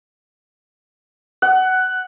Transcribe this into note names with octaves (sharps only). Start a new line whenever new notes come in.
F#5